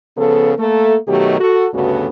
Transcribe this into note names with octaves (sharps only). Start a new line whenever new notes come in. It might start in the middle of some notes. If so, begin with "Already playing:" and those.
C#3 F3 B3 A4
A3 A#3 A4
B2 D#3 F#3 A3 G4
F#4 A4
D2 G2 C#3 B3 F#4 A4